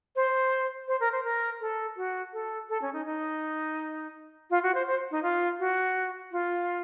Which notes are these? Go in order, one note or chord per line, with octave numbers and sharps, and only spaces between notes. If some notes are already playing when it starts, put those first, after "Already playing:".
C5
C5
A#4
C5
A#4
A4
F#4
A4
A4
C#4
D#4
D#4
F4
F#4
C5
C5
D#4
F4
F#4
F4